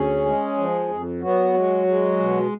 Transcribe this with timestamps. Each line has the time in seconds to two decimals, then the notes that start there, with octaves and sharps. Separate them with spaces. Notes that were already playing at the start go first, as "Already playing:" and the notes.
Already playing: D2 C#4 G#4
0.25 G#3
0.58 F3
0.89 F2
1.22 F#3 B3 F#4
1.54 G#3
1.87 G#3
2.19 B2